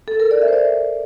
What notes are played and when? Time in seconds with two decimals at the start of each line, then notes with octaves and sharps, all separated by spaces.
0.08 A4
0.20 A#4
0.31 D5
0.42 E5
0.48 C5
0.53 D5